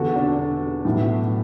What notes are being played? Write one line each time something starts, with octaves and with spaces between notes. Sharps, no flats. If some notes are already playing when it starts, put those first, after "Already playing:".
Already playing: E1 E2 D3 F#4 A4
D4 F#4
B1 A2 E3